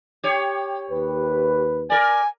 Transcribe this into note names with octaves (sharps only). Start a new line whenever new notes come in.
G4 C#5
D#2 B4
A#4 D5 G#5